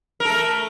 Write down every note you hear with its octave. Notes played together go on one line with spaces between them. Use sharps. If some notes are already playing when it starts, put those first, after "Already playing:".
A3 A4 A#4